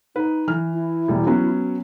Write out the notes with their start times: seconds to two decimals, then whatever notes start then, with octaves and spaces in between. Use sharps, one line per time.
0.16 D#4 B4
0.48 E3 F6
0.74 E4
1.08 E1 G3
1.27 F#3 B3 C#4